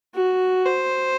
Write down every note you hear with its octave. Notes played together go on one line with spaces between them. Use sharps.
F#4
C5